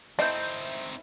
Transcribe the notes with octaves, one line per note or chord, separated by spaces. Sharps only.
A3 C4 D#4 E4 C5 D#5 G6